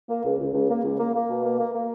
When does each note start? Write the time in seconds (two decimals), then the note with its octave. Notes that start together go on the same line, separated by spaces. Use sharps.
0.09 A#3
0.24 C#2
0.38 C#2
0.53 C#2
0.69 A#3
0.83 C#2
0.99 A#3
1.14 A#3
1.29 B2
1.43 A#3
1.59 A#3
1.74 A#3